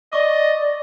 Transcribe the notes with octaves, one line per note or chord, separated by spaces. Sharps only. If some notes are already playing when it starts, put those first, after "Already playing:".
D5 D#5 C#6 D6